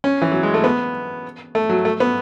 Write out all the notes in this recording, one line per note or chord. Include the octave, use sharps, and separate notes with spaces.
C#4
E3
F#3
G#3
A3
B3
A3
F#3
A3
B3